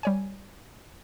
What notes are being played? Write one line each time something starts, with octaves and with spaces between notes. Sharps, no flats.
G3 C#5 G#5